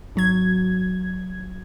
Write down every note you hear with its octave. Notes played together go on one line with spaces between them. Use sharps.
G#1 F#3 G#6